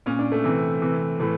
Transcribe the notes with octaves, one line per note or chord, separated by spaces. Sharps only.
A#2 C#4
D4
A3
C3 E3
C3 E3
A2 E3 A3